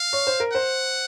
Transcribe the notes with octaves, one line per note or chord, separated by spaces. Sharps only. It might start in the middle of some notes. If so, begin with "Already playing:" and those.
Already playing: F5
C#5
C5
A#4
C5 F#5